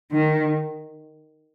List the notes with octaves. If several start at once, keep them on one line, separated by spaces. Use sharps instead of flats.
D#3